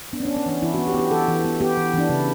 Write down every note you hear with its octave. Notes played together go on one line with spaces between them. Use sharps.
B3 D4
C#4
B3 D4
C#4
E3 D4
E3 E4
F#4
B3
G4
B3
G4
E3 A4
E3
B3
B3 G4
E3
E3 D4
C#3 E4